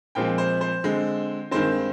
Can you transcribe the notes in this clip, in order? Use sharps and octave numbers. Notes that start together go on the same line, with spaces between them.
A#2 F3 G#3 C4 G5
C5
C5
D3 G#3 C4
G2 D#3 G#3 C4 C5